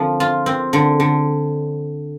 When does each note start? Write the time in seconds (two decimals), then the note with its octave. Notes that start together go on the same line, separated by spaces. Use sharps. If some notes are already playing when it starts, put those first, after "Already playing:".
Already playing: D3 F3 C4
0.20 F4
0.46 C4
0.73 D3
1.00 D3